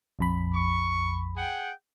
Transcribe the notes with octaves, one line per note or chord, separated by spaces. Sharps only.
A#1 F2 B5
C#6
G#4 F#5 G5